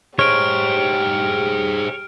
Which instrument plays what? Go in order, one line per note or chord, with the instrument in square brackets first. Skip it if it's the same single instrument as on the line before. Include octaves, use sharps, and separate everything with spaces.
[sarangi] G4 [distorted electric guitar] G#4 C5 [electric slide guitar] C#5 [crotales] F6 D7